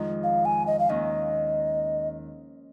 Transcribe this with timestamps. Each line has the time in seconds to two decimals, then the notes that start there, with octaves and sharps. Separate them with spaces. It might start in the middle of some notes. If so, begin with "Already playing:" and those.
Already playing: F2 D#3 G#3 D#4
0.24 F5
0.45 G#5
0.67 D#5
0.79 F5
0.89 D#2 D#3 C#4 D#5